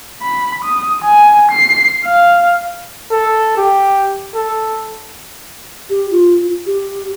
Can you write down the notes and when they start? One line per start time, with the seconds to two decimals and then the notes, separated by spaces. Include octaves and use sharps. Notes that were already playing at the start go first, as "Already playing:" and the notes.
0.22 B5
0.65 D#6
1.04 G#5
1.52 C7
2.05 F5
3.11 A4
3.57 G4
4.35 A4
5.90 G4
6.11 F4
6.66 G4